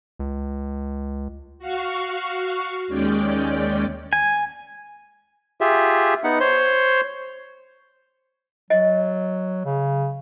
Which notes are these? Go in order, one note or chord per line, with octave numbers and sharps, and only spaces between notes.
C#2
F#4 F5 C#6
D#2 G#3 C#4 D5 G5
G#5
F4 G4 G#4 E5
B3 D#4 F#5
C5 C#5 C6
F#3 D#5
C#3